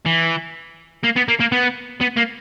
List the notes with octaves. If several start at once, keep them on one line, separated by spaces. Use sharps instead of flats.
E3
A#3
B3
A#3
A#3
B3
B3
A#3